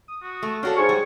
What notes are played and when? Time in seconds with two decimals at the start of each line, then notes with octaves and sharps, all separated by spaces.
0.08 D#6
0.22 F#4
0.42 A3
0.63 D4 F#4 A4 C#5 F5
0.77 G#2 G#4 C#5 C#6
0.89 G3